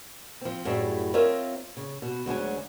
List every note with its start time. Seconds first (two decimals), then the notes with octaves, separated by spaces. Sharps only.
0.41 F3 C4
0.65 F#2 A2 G3 G#4 E5
1.14 C4 F4 A#4 C#5 D#5 E5
1.77 C#3
2.02 B2
2.26 D2 F#3 G#3 C#4